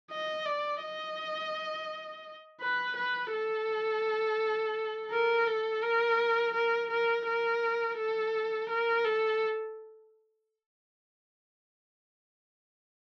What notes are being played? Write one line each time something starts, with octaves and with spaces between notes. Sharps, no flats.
D#5
D5
D#5
B4
B4
A4
A#4
A4
A#4
A#4
A#4
A#4
A4
A#4
A4